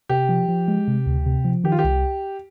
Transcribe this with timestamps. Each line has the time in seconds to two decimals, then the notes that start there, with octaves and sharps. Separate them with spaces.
0.09 C3 G4
0.29 F3
0.48 F3
0.68 G#3
0.88 C3
1.06 D2
1.26 C3
1.45 F3
1.64 D#3 G4
1.72 F4
1.79 G4
1.84 C2